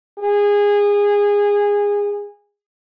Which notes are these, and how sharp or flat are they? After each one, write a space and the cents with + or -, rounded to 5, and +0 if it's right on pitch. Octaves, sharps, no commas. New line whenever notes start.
G#4 -20